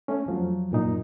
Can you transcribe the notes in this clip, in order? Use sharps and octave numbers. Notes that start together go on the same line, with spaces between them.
A3 C#4
F2 F3 F#3
F#2 A#2 D#4